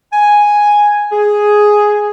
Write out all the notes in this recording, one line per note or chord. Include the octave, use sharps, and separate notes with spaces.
G#5
G#4